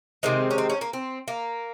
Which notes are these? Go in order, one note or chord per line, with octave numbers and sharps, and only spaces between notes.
C3 D#3 G#3 C4
C#4
C4
C#4
A#3
C4
A#3